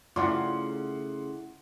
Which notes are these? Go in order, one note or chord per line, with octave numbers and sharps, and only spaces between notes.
C#3 A3 E4 F4 D5 F#5 C6 D6